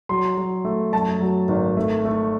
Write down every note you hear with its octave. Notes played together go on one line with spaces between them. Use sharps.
F#3 C6
F#3
A3
F#2 A5
F#3
G#1
A3
A3